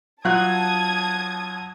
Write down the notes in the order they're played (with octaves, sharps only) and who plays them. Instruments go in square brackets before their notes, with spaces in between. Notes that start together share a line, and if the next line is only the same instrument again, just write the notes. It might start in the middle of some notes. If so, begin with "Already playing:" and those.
[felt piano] F#3 F4 F#6 [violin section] A5 D#6 G#6